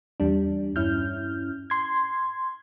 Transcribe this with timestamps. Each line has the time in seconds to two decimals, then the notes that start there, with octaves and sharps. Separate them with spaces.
0.20 E2 G3 D4
0.76 G2 C#4 E4 F6 G6
1.70 C6 G#6